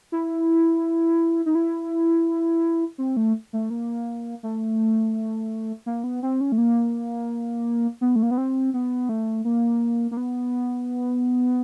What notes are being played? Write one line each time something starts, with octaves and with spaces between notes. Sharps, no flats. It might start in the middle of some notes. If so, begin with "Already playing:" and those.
E4
D#4
E4
C4
A3
A3
A#3
A3
A#3
B3
C4
C#4
A3
A#3
B3
A3
A#3
B3
C4
B3
A3
A#3
A#3
B3